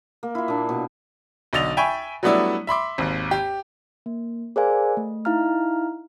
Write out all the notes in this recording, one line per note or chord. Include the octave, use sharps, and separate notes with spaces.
A#3
E4 F4
A#2 D4
B2
B1 D3 D#5 A6 F7
E5 G5 G#5 B5 C#6
F#3 G3 A3 B3 D4 E4
E5 B5 C6 D6
G#1 D#2
G4
A#3
G#4 A#4 C5 D5 F5 G#5
A3
D#4 E4 F5 A#5 F6